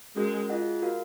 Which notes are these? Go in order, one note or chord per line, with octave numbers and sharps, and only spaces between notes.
G#3 C#4 F#4 A#4
F4 G#4 D#5 F#5
F#4 A#4 F5